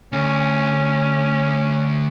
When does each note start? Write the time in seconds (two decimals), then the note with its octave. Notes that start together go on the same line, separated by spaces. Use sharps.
0.12 D2 C#4